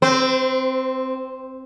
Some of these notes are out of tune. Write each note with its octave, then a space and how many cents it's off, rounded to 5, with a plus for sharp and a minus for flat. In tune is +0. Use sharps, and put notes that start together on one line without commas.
C4 +0 C5 -30